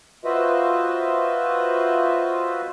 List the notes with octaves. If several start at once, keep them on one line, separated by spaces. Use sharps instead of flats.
F4 F#4 B4 C5 D#5 E5